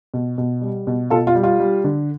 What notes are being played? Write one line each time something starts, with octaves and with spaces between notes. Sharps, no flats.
B2
B2
G3
B2
B2 F4 A4
F4
G3
F4
G3
D3